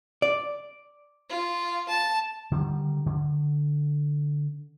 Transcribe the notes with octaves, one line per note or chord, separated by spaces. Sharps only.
D5
F4
A5
D3 D#3 G3
D3